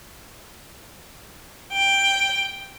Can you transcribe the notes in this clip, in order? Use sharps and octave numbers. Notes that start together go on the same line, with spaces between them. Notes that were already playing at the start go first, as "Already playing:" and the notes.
G5